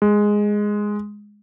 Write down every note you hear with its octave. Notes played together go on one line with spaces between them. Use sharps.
G#3